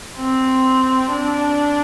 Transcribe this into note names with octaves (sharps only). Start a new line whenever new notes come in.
C4
D4